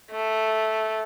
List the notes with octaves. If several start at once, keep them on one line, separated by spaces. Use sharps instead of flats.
A3